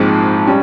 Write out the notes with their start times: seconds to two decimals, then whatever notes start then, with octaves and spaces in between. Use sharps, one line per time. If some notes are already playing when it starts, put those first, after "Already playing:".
Already playing: A#1 G#2 F3 G#3 C4
0.47 G3 C#4